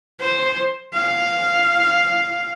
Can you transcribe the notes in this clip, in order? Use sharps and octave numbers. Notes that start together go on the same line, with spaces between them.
C5
F5